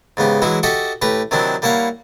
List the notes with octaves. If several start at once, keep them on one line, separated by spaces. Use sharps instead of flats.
G#2 C#3 B3 G4
E3 F#3 G#3 E4 F#4
F#4 G4 A4 D#5 E5 F#5
A2 G4 B4 A#5
C3 D#3 F#3 C4 D4 E4
G3 A#3 E4 C#5 F5 F#5